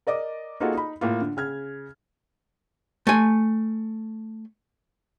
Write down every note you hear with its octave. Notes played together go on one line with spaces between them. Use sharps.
A#4 D5 D#5 D6
A#3 D#4 F4 F#4 G#4 A4
D#4 B5
A2 A#3 F4
D3
C#3 F6 G#6
A3 G#5